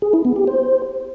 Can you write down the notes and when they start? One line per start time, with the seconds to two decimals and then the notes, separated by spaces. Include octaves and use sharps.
0.02 G#4
0.13 E4
0.25 B3
0.36 G4
0.47 C5